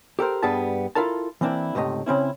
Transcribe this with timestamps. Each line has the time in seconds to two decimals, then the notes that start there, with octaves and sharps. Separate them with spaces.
0.19 G4 A4 A#4 C5
0.43 G2 G3 B3 G#4 A5
0.95 E4 F4 A4 A#4 A5
1.41 E3 A#3 C4 D4 E4
1.75 C#2 G#2 C3 A3 D#5
2.06 C#3 C4 C#4 E4